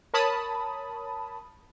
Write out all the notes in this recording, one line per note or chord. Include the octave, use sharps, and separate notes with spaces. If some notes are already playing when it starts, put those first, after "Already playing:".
A#4 C#5 A5 B5 D#6